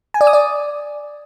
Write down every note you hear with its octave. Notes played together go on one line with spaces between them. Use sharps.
G#5
D5
D#6
D5